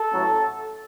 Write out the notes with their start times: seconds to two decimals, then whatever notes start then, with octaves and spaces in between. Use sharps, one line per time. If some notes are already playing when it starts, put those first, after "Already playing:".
Already playing: A4
0.12 A1 A2 F#3